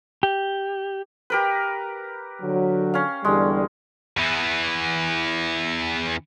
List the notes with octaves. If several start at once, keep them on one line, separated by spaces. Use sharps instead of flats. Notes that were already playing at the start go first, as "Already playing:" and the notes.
G4
G4 A#4 B4
D3 F#3
C#4 F5
E2 D3 G3 G#3
E2 E3